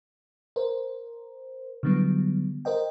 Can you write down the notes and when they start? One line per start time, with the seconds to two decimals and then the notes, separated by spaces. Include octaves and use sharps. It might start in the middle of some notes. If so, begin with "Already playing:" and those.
0.56 A#4 C5
1.83 D3 E3 F#3 G3 B3
2.65 A#4 C5 D#5 G5